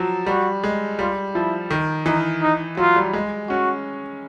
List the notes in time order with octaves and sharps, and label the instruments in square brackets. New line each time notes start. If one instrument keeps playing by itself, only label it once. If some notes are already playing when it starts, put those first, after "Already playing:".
Already playing: [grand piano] F3 F#3
[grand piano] G3 [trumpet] F#4
[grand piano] G#3
[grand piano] G3 [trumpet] F4
[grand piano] F3 [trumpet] E4
[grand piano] D#3
[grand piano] E3 [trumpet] D#4
[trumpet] D#4
[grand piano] F#3 [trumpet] F4
[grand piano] G3
G#3
[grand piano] C#4 [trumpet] F#4